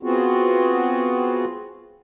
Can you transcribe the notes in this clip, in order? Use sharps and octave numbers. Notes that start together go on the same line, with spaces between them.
B3 C4 F4 F#4 G#4